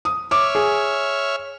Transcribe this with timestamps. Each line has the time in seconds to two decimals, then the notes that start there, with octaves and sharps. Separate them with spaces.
0.05 D#6
0.31 C#5 E5 D6 F6
0.55 G#4